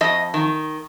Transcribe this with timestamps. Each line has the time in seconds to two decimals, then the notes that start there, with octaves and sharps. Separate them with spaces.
0.01 F2 D#5
0.34 D#3